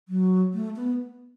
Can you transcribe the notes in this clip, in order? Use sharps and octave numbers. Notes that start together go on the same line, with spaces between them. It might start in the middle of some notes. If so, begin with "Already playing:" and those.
F#3
A3
B3